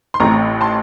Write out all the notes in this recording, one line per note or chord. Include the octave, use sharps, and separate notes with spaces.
C6
A1 A2 A3 C4 A#5 C#6
A5 C6